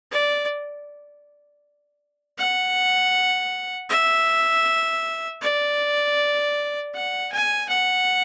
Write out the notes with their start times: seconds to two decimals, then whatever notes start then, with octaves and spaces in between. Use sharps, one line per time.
0.12 D5
2.38 F#5
3.90 E5
5.41 D5
6.94 F#5
7.32 G#5
7.69 F#5